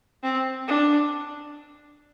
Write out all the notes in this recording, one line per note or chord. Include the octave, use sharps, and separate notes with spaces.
C4
D4